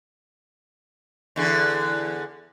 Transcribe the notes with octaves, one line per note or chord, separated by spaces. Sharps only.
E2 D3 G#4